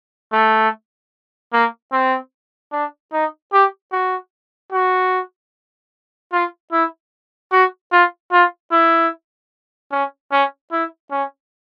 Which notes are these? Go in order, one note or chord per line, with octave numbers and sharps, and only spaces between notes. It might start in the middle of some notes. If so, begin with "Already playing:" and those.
A3
A#3
C4
D4
D#4
G4
F#4
F#4
F4
E4
F#4
F4
F4
E4
C#4
C#4
E4
C#4